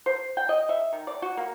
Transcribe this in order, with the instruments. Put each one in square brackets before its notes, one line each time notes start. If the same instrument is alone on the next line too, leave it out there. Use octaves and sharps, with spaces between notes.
[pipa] C5
G5
D#5
E5
D#3
D5
F#4
A#3